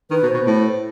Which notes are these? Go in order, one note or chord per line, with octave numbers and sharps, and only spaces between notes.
D#3 B4
B2
C5
B2
A2